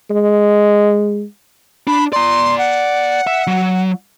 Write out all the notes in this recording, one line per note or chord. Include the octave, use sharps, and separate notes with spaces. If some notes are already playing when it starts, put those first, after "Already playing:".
G#3
D4 B5
D5 A#5 C6
F#5
E5
F#3